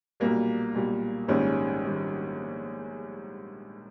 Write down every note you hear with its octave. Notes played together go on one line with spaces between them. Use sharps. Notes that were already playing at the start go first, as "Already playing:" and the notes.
B1 A#2 G3 A#3
B1 A#2 G3
A#1 G#2 D#3 G3 C#4
D#3 G3